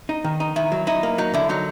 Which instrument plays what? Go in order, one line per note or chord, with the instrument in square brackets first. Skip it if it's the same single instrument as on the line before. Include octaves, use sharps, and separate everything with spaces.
[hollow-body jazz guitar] D#4
D#3
D#4
[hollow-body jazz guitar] D#3 [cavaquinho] E4
[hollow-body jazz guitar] F#3
[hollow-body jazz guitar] D#4 [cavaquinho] E4
[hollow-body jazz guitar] A#3
[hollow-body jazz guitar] F#3 [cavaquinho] D#4
[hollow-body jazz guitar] D3 [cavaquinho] E4
[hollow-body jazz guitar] F#3 [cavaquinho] D#4